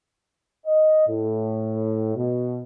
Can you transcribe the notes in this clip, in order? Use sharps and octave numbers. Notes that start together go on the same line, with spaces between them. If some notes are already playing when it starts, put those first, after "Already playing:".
D#5
A2
B2